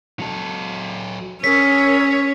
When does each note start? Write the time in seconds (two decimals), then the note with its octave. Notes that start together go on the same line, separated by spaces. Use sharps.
0.20 F#3 A4
1.44 C#4 G#4 A#4 C#5 E6 B6